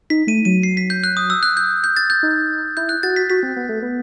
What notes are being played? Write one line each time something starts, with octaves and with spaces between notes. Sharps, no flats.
D#4 B6
A3 D#7
F#3 D#7
C7
B6
G6
F#6
D#6
E6
F#6
G6
G6
A6
G6
D#4
E4 G6
F#6
F#4 A6
B6
F#4 B6
C4
B3
A3
B3